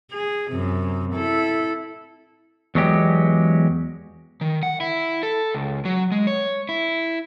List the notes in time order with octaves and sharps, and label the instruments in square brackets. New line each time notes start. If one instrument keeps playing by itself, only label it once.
[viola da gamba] G#4
F#2 C3
E4 A4
[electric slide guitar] E2 F#3 G#3 G4
[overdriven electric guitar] D#3
F#5
E4
A4
C#2
F#3
G#3
C#5
E4